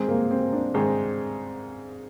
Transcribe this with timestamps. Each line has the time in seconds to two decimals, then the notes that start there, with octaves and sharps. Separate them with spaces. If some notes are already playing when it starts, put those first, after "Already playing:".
Already playing: G#2 D#3 G#3 C4
0.08 A#3
0.31 C4
0.53 D4
0.74 G#2 D#3 G#3 C4